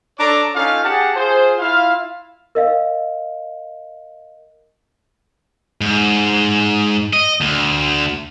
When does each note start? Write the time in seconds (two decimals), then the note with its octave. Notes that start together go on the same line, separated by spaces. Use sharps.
0.19 D4 A4 C#5 A#5 D6
0.56 C#4 D#4 F4 A4 F5
0.84 G4 G#4 F#5 A5
1.15 F4 G#4 C5
1.59 E4 F4 F5
2.55 A#4 D#5 F5
5.81 G#2
7.13 D#5
7.41 D2